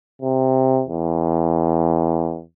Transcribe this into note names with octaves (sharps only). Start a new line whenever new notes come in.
C3
E2